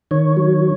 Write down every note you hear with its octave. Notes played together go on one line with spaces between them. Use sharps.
D#3 C#5
F#3